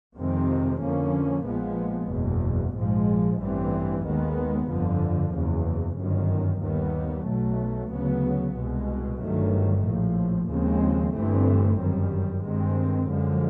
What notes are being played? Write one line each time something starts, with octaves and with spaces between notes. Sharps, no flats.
F2 C3 D#3 G#3 C4
F2 D3 F3 A#3 C#4
A#1 A#2 F3 G#3 B3
F#1 E2 B2
A#1 G#2 F3 G#3
A1 G2 E3 G3 C4
D#2 D#3 G#3 B3
G1 F2 D3 F3
F#1 E2 C#3
G1 F#2 D#3
D#2 D#3 G3 B3
B1 B2 F#3 A3
D2 C#3 F#3 B3
C2 B2 G#3
G1 G2 D#3 F#3 A3
A#1 A2 F3
D#2 C#3 F3 G#3 C4
G1 G2 E3 A3 C4
G1 F#2 D#3 G3
G2 D#3 G#3 C4
F#2 D3 F3 G#3